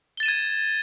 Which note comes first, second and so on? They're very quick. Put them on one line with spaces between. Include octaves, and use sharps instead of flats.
G7 A6 E7 D#7 G#6